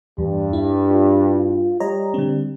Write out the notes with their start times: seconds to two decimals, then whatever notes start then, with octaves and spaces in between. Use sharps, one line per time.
0.18 E2 G2 G3
0.53 E4
0.89 F4
1.80 G3 C#5 D#5 A#5
2.14 D3 C4